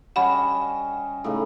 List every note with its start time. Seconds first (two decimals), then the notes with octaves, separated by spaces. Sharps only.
0.16 G3 C#4 D#5 F#5 B5
1.24 A2 C#3 D#4